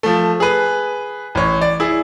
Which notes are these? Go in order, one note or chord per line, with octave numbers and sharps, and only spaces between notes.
F3 A3
G#4 B4
A1 C#5
D5
E4 G#4